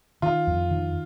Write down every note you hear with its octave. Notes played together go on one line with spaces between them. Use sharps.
D#3 F4
F2
D#3